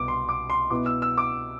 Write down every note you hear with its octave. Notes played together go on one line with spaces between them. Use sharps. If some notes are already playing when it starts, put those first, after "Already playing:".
Already playing: C2 B2 B3 D6
C6
D6
C6
B2 B3 E4 D6
E6
E6
D6